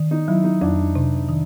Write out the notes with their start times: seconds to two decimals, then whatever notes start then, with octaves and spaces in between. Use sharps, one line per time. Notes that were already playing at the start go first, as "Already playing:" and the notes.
Already playing: D#3
0.11 D#4
0.28 F#3 E4
0.44 D#4
0.61 F2 D4
0.95 C3
1.29 D#3